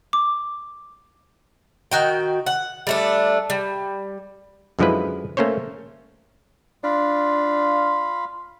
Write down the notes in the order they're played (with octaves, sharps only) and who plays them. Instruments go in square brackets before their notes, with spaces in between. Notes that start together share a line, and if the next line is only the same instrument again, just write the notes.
[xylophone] D6
[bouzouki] D#3 F#4 G5
F#5
G3 A3 D4
G3
[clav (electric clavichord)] F#2 D3 F3 G#3 E4 B4
A3 A#3 C#4 C5 C#5
[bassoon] D4 [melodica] F4 F5 B5